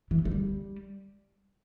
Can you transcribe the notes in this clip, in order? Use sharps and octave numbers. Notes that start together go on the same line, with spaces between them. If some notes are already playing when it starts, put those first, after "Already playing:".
E3
A3
G3